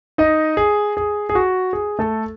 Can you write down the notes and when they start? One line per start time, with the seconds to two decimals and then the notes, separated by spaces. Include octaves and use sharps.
0.18 D#4 D#5
0.57 G#4
0.97 G#4
1.29 G#4
1.35 F#4
1.73 G#4
1.99 A3 A4